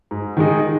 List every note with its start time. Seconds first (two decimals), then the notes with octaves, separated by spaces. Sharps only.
0.11 G#2
0.37 D#3 G#3 D#4 G#4